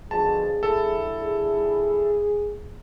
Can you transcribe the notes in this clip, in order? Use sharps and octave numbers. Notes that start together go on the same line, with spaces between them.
B2 D3 F3 G#4 A5
D3 G3 E4 A4
G#4